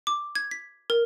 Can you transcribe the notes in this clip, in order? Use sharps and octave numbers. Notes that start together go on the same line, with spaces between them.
D6
G#6
B6
A#4